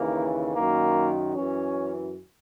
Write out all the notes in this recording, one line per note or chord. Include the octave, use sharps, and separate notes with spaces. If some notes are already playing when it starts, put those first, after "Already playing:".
Already playing: D#2 C#3 E3 A#3
F#2 D#3 A#3
F#2 E3 C#4